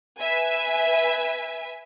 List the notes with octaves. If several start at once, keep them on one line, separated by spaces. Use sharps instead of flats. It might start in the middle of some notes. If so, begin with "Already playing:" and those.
B4 E5 G#5